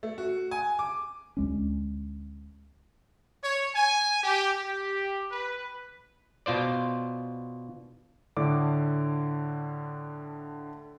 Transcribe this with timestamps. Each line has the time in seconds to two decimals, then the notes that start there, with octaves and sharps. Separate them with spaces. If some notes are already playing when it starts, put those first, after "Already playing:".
0.03 A3
0.18 F#4
0.51 G#5
0.79 D6
1.37 D2 G#3 C#4
3.43 C#5
3.75 G#5
4.23 G4
4.64 G4
5.31 B4
6.46 B2 F4 C5 D5
8.37 A2 D3 D4 D6